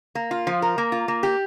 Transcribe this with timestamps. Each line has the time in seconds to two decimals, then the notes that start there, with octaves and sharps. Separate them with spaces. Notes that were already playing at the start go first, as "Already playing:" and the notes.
0.15 A#3
0.31 F4
0.47 F3
0.62 A#4
0.78 A#3
0.92 F4
1.08 A#3
1.23 G4